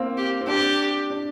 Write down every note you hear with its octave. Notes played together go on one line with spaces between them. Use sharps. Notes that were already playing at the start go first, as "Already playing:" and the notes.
Already playing: A#3 C4
G4
C4
D4 G4
D4